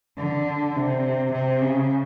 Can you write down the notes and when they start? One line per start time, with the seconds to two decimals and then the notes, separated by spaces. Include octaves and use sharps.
0.18 D3
0.75 C3
1.32 C3
1.62 C#3